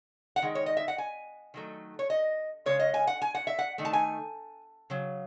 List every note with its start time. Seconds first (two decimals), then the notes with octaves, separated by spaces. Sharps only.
0.36 F#5
0.42 D#3 G#3
0.55 C#5
0.66 D#5
0.77 E5
0.88 F#5
0.98 G#5
1.54 D#3 F#3 A3
1.99 C#5
2.10 D#5
2.66 C#3 G#3 C#4 C#5
2.80 D#5
2.94 G#5
3.07 F#5
3.22 G#5
3.35 F#5
3.47 E5
3.59 F#5
3.78 D#3 A3
3.85 A5
3.93 G#5
4.90 C#3 F#3